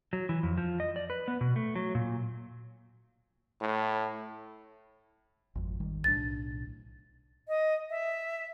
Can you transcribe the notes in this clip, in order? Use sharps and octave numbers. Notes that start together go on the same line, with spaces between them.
F#3
E3
F2
F3
D#5
D5
B4
B3
B2
A3
F#3
A#2
A2
G#1 F2
G#1 D#3 G3
B1 A2 D4 A6
D#5
E5